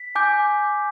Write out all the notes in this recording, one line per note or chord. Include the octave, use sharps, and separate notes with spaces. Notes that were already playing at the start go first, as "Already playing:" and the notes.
Already playing: B6
G#5 D6 G6